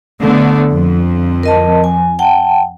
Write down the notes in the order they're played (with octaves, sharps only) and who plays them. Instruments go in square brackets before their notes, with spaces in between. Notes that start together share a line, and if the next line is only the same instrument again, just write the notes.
[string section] D3 A3 B3
F2
[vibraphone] A#4 D#5 A5
G#5
F#5 G5 A5